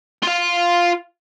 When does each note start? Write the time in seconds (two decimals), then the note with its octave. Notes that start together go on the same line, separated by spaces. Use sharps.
0.23 F4 F5